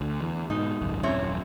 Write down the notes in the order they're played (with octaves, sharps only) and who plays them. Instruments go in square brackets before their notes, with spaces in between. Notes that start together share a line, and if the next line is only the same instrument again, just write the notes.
[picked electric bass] D2
E2
[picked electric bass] G#2 B2 [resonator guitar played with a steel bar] D#4
[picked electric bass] G#1 C#2 F#2
[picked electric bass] D#1 F#2 [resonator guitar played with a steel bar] C4 E4 C#5